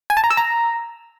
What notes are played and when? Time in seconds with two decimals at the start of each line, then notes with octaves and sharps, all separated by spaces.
0.10 G#5
0.17 A5
0.24 A#5
0.30 E6
0.37 A#5